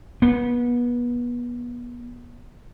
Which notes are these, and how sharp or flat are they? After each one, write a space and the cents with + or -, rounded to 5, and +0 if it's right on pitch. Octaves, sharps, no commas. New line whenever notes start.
B3 -30